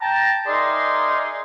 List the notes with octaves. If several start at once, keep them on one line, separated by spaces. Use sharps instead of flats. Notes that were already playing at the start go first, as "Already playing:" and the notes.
G5 A5 A#5
D#4 G#4 A#4 D5 E5 C6